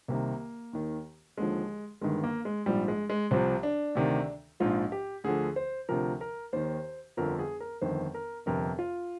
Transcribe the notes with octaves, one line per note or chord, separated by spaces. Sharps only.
C2 C3 D#3 A#3
D#2 D#3
D#2 D3 F3 G#3
G1 G2 D#3 G#3
A#3
G#3
A#1 G#2 F3 G3
G#3
G#3
C2 C3 F3 C4
D4
D2 C3 D#3
A#1 G#2 F3 F4
G4
D2 D3 F3 G#4
C5
D2 C3 F3 A#4
A#4
D#2 D#3 C5
G1 F2 D3 F3 A#4
G#4
A#4
G1 F2 D#3 C5
A#4
G1 F2 C3 A#4
F4